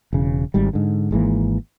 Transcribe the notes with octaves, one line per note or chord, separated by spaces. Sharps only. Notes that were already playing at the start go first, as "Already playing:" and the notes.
E1 C#3
G#1 G#2 G3
G#2 D3
G#1 G#2 E3 A#3